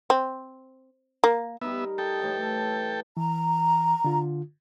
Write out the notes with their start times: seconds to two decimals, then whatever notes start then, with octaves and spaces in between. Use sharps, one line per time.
0.10 C4
1.24 A#3
1.61 G3 B3 D#4 A#4 E5
1.98 A4 D#5 G5
2.20 A2 E3 A5
3.17 E3 A#5
4.04 D3 F4